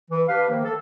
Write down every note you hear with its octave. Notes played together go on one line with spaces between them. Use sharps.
E3
D4 G4 B4 F5
D#3 F3 A#3
A4